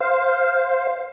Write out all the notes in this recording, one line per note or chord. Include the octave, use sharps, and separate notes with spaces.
C5 F5